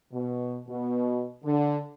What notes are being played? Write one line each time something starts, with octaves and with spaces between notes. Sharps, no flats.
B2
B2
D3